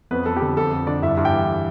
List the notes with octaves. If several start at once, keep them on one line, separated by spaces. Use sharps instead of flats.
F2 B3 B4
F2 A4
G4
D3 A4
F2 A4
F2
D3 D4 D5
G2 E4 E5
G2
G4 G5
E3